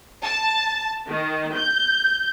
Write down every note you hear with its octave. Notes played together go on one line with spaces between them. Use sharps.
A5
D#3
G6